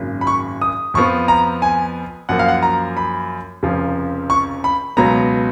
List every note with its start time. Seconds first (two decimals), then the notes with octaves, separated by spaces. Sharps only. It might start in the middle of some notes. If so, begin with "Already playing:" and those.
Already playing: G#1 F#2 C#3 F#3 A#3
0.21 B5
0.27 C#6
0.62 D#6
0.94 F2 F3 B3 C#6
1.28 A#5
1.62 G#5
2.29 F#2 F3 A#3 F#5
2.39 F5
2.48 F#5
2.62 A#5
2.97 B5
3.63 F1 F2 C#3 F3
4.30 C#6
4.64 B5
4.97 C#2 B2 F#3 B3 A#5